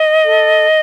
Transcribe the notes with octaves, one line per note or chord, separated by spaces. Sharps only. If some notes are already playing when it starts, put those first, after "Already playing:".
Already playing: D#5
A4